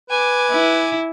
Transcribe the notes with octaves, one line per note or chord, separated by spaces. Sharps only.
B4 G#5 D6
E4